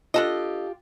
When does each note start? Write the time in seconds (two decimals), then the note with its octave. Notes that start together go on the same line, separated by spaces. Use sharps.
0.14 D4 F4 G4 A4 D#5